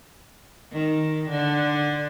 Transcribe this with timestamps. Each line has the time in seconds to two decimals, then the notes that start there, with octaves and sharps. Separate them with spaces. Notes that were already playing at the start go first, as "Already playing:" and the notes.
0.72 D#3
1.30 D3